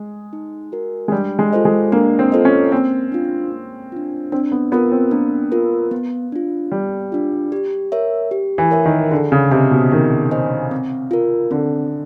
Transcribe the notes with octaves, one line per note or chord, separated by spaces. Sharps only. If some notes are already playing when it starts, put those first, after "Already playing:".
Already playing: G#3
D#4
F#4 A#4
G#3
G3 D4
G#3
F4 A4 C5 D#5
G#3
A#3 D4
C4
F4 A4 C5 D#5
C#4
A#3 C4
D4 F4
A#3
D4 F4
C4 D4
B3
B3 F4 A#4
C4
A#3 D4
F4 A#4
B3
D4 F4
G3 B3
D4 F4
G4
A#4 C#5 E5
G4
E3
A#4 C#5 E5
D#3
D3 G#4
C#3
C3 C5 D#5 G#5
B2
D#3 G#4
C5 D#5 G#5
C4
F4 A#4
D3 C4